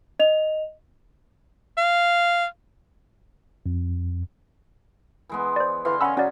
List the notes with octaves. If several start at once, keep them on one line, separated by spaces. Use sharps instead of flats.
D#5 F7
F5
F2
E3 G#3 B3
C5 D5
D3 E3 F5 C6
C#4 C#5 D#5 F#5 B5 E6
C#3 F#3 C#4 D5